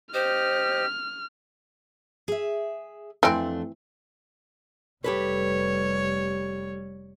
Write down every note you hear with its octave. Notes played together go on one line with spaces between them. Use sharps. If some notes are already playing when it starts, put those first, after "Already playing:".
G4 C5 D#5 F6
G#4 E5
F2 E3 A3 C4 D4
F1 G3 G4 A4 B4 C#5